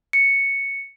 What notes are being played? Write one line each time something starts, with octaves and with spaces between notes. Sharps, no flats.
C#7